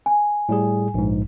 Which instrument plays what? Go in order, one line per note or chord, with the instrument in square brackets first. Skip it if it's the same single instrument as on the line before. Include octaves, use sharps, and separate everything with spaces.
[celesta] G#5
[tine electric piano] A2 G3 G#4
A#1 G#2